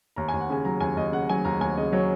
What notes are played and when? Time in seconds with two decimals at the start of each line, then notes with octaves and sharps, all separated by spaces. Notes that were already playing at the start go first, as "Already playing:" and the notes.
0.16 D#2 A#5
0.28 G#5
0.34 D#2
0.40 F#5
0.50 C#3 G#5
0.65 F#3 A#5
0.80 D#2 G#5
0.97 D#2 D#5
1.12 C#3 F#5
1.29 F#3 G#5
1.45 D#2 A#5
1.61 D#2 G#5
1.77 C#3 D#5
1.93 F#3 C#5